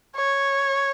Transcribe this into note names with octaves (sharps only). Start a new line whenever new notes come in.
C#5